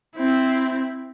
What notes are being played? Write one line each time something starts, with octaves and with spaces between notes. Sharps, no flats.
C4 E4